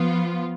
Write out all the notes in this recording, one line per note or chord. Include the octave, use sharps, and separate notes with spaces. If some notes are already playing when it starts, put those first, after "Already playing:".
Already playing: F3 B3 F4